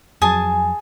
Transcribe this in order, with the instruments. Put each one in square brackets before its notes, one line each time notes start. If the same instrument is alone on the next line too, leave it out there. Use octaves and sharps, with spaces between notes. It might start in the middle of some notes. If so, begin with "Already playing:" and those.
[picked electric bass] F2 F#3 [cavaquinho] G#4 G#5 A5